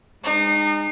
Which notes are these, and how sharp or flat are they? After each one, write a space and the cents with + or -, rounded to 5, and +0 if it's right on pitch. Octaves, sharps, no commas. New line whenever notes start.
G#3 -30 D#4 -35